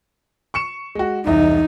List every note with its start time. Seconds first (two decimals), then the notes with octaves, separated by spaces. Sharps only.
0.54 C#6 C#7 E7
0.95 G#3 F#4
1.26 E1 C2 D#4 D#5